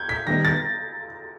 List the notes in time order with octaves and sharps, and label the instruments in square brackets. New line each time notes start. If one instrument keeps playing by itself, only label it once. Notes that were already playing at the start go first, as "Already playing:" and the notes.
Already playing: [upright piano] G6 G#6
B6
[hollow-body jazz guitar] D#3 G3 B3 D#4 [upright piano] A#6
[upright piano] A6